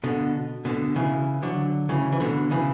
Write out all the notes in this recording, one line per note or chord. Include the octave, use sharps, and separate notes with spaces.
B2 D3
B2 D3
C#3 E3
D3 F#3
C#3 E3
E3
B2 D3
C#3 E3